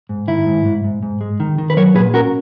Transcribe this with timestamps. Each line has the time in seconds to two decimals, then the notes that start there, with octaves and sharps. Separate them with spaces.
0.09 G#2
0.28 D#3 E4
0.46 G#2
0.65 G#2
0.84 G#2
1.03 G#2
1.21 G#3
1.40 D#3
1.58 D#3
1.70 B4
1.77 F#3 A#4 C#5
1.95 A#2 G#4 B4
2.14 C#4 F#4 A#4